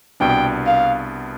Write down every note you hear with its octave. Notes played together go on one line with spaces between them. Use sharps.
C2 B2 B3 D4 G5
F5